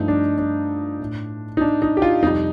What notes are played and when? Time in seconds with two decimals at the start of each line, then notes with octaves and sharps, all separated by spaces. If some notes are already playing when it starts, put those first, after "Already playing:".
Already playing: G2 F3 A3 D#4
0.08 D4
0.38 D4
1.00 A2 A3
1.57 D#4
1.61 D4
1.82 D#4
1.97 G4
2.02 F4
2.22 F2 C3 G3 D#4